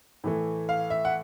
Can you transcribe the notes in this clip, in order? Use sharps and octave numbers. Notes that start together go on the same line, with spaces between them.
A2 E3 A3
F5
E5
F#5